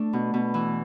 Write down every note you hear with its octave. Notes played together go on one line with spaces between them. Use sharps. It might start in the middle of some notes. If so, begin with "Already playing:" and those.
Already playing: A3 D4
B2
B2
E3